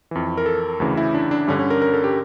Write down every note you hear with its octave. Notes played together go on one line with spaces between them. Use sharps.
F2 E3
A#4
A4
D2 C#3 E3
E4
D4
D4
G2 D3 C#4
C#4
A#4
A#4
A4
G4